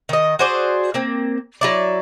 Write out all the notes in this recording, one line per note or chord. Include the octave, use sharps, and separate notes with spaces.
D#3 D#5
F#4 G#4 C5 D5
A#3 C4
F#3 E4 D5